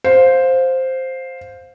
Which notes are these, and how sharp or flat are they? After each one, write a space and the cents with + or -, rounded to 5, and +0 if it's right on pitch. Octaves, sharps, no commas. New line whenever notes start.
C5 +0 F5 +15